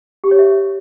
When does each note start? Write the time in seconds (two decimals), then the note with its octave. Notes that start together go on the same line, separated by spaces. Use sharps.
0.24 G4
0.31 C#5
0.39 E5